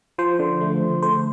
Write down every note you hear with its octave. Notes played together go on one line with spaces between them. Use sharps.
F3 C5
D3
A3
D3
A3 C5